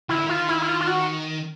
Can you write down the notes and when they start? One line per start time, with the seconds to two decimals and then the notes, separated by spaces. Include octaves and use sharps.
0.09 D#3 E4
0.17 D3
0.26 D#3 F4
0.49 E4
0.62 E4
0.68 F4
0.81 F4
0.87 F#4